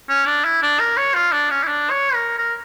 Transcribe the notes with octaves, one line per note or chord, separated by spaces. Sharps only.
C#4
D4
E4
D4
A#4
C#5
F4
D4
C#4
E4
D4
C#5
A#4
A#4